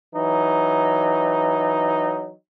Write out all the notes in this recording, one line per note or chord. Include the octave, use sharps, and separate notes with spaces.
E3 F#3 D#4